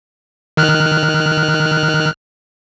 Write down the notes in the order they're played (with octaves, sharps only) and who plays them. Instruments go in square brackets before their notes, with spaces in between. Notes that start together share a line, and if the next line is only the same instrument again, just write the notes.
[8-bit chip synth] D#3 F6 F#6